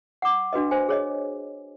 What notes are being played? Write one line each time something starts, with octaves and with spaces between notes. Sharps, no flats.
F#5 D6
D4 F#4 B4 D#5
C5 G#5
G#4 C#5 D#5